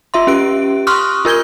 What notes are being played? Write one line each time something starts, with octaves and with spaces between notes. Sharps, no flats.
F4 E5 C6
C#4 G4 D7
C6 C#6 D#6 F6 F#6
F4 A#4 G6 G#6 G7